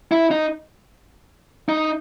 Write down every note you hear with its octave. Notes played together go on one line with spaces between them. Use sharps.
E4
D#4
D#4